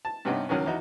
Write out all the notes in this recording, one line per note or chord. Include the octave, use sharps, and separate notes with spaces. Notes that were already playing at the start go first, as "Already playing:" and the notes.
A5
G2 C3 B3 C#4 D#4
C#2 D#3 F#3 C#4
E2 D#4 F#4